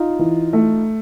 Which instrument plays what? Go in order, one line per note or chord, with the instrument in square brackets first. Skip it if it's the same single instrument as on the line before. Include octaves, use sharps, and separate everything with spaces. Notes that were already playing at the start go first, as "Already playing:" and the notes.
Already playing: [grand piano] D#4 F4
[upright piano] E3
A3